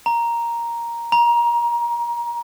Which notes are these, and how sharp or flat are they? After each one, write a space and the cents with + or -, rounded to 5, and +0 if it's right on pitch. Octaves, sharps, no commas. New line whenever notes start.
A#5 +5
A#5 +25